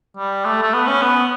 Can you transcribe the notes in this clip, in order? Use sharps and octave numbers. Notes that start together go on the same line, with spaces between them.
G3
A3
A3
B3
C#4
B3